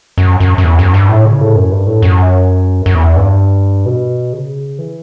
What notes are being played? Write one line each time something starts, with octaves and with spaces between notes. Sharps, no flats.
F#2
F#2
F#2
E2
F#2
G2
A2
C#3
A2
F#2
G2
A2
F#2
F#2
E2
G2
B2
C#3
E3